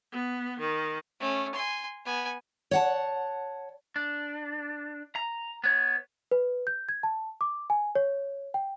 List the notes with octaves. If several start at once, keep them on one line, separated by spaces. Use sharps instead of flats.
B3
D#3
A3 C#4
G#5 C6
B3 G#5
C#5 F#5 A5
D4
A#5
B3 C#5
B4
G6
G#6
A5
D6
G#5
C#5
G5